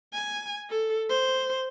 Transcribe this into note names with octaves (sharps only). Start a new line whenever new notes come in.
G#5
A4
C5